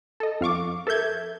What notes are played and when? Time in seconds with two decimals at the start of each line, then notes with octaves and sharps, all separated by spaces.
0.20 A4 D#5
0.41 F2 F5 C#6 D6
0.87 A4 A#4 E5 G6 G#6